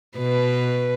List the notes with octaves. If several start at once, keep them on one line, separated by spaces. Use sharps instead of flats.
B2 B4